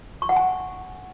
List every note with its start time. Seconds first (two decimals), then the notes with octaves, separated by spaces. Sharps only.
0.22 C#6
0.29 F#5
0.36 G#5